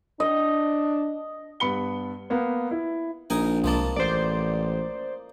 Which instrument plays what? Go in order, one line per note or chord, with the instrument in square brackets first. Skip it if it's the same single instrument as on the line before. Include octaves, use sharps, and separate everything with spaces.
[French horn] D4 [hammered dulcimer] D#5
[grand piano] G2 B3 B5 C#7 G7
A#3 B3
E4
[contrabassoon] A#1 [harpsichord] D#4 A#4 G#5
[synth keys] C2 A5 [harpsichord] F3 G#3 A#3
[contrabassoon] A1 [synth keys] C5 D5